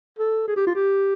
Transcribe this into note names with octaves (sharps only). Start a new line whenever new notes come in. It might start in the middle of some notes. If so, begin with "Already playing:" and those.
A4
G#4
G4
F4
G4